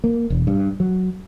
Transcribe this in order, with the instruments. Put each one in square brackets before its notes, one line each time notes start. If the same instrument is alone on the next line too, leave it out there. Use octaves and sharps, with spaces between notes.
[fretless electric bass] A#3
E1
G2
F#3